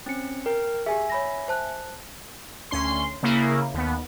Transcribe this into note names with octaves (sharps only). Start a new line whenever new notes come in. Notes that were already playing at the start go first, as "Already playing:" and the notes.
C4 C#4 C#7
A#4 G5
G4 G#4 E5 G#5
C#5 B5 A#6
C5 A5 F#6
D2 C#4 C6
C#3 A#3 E4
D#2 B3